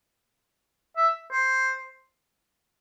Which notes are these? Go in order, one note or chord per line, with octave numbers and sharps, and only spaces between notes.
E5
C5